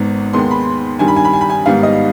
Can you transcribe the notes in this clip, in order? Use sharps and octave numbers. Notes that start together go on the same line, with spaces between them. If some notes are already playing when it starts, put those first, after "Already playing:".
Already playing: G#1 G#2 D#3 B3
D#2 D#3 G#3 B3 C6
B5
G2 D#3 G3 G#5
B5
G#5
B5
G#5
B5
G#5
G#1 G#2 D#3 G3 B3 F5
D#5